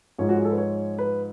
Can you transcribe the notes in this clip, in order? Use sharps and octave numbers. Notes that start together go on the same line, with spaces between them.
G#2 F3 G#3 C#5
F#4
G#4
A4
B4
C#5
B4